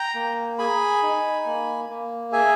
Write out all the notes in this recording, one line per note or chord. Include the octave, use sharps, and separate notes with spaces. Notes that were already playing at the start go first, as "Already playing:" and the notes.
Already playing: G5 A#5
A#3
G#4 G#5 B5
D#4
A#3
A#3
G#4 E5 G#5